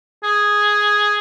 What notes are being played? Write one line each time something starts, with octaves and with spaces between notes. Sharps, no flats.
G#4